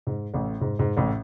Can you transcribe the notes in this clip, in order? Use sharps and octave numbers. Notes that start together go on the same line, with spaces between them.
G#2
A1 A2
G#2
G#2
A1 A2